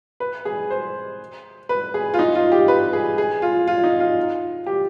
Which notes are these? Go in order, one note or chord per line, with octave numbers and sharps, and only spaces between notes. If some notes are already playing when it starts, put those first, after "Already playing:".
B4
G#4
C5
B4
G#4
F4
D#4
F4
G4
B4
G#4
G#4
F4
F4
D#4
F4
G4